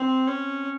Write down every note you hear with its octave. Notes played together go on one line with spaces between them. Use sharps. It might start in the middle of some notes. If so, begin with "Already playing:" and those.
Already playing: C4
C#4